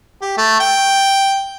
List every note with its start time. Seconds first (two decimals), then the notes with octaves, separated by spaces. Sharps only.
0.22 G4
0.37 A3
0.60 G5